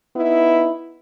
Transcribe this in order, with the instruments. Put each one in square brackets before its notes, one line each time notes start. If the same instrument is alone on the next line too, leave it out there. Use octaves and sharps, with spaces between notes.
[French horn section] B3 D#4 E4